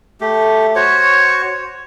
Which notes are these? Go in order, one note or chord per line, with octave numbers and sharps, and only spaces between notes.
A3 G4
F#4 C5 C#5 C#6